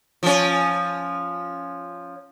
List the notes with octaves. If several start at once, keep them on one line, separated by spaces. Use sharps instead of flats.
F3 C#4